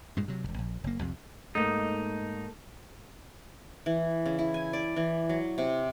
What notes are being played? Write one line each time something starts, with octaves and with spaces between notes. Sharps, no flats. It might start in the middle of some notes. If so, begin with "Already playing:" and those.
G2 A#2 G#3
C3 F#3
E1 B1
A#1
F#1 A#3
C2 F2 C3
G#2 A3 A#3 D#4
E3
C#3
E4
G#5
D5
E3
F#3
C3